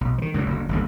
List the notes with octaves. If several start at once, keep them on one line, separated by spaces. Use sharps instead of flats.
B1
D#3 F3
C#2 F#2 A#2
F#1 D2
G1 D#2 D3